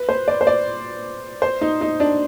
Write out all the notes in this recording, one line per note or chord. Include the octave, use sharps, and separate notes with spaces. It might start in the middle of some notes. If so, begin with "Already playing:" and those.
Already playing: B4
C5
D5
C5
D5
C5
D#4
D#4
D4